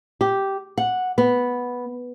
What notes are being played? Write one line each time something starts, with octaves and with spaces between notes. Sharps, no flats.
G4
F#5
B3